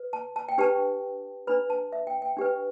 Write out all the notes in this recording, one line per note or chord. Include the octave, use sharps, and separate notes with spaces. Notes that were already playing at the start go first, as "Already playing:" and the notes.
Already playing: B4
A5
A5
G5
D4 G4 B4 A5
D4 B4 B5
A5
E5
G5
G5
D4 G4 B4